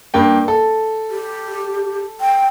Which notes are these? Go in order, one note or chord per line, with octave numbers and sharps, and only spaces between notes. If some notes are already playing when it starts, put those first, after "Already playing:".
G2 A#3 G5
A4
G4
G5